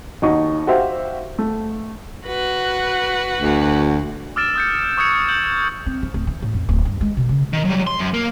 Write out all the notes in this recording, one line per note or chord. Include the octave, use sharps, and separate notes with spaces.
D#2 D#4 F#4 C#6
F#4 G4 C5 E5 F5
A3
F#4 B4
D2
D6 E6 F6 A6 D7 E7
D#6 G6 C#7
C#6 D#6 F#6 G#6 C#7
G6 F#7
C4
F3
D1
E3
A2
F2
D1
G2
G#3
B2
C#3
D#3
F#3 G3
C6
F#2
A#3